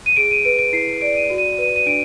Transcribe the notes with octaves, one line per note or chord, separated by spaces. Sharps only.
D#7
G#4 D7
D#7
B4 D7
D7
E4 C7
D5 D7
D#7
F#4
D#7
B4 D#7
D#7
D4 D7